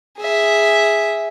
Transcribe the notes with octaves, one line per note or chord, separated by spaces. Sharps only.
G#4 E5